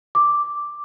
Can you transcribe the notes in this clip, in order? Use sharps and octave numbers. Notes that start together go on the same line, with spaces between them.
D6